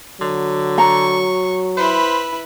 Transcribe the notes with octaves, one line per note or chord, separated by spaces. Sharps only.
D3 F#3
A#5 C#6
E4 B4 C5